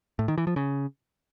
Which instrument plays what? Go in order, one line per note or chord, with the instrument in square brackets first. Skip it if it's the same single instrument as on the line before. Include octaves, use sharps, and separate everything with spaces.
[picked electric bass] A2
D#3
E3
F3
C#3